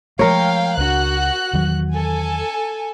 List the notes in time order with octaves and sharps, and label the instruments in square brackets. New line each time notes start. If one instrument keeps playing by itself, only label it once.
[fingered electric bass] F3 G#3 A3 [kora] A#4 C#5 [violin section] F5 G5
[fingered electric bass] C#2 D4 [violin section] F#4 F#6
[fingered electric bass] E2 D#3 F#3
[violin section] A4 G#5